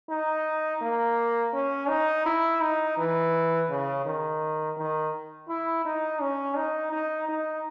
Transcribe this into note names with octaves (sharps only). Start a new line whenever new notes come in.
D#4
A#3
C#4
D#4
E4
D#4
E3
C#3
D#3
D#3
E4
D#4
C#4
D#4
D#4
D#4